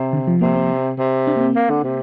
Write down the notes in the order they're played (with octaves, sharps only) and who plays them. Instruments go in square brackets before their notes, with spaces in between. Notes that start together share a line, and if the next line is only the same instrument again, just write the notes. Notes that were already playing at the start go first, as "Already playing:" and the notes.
Already playing: [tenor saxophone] C3
[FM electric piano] D3
F3
[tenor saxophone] C3 [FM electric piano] A#3
[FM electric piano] C4
[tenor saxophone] C3
[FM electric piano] D4
A#3
C4
[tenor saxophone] A#3
D3
C3